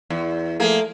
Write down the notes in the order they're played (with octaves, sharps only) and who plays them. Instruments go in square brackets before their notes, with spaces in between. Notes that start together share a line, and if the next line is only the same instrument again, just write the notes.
[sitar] E2
[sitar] F3 A#3 G#4 [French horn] A3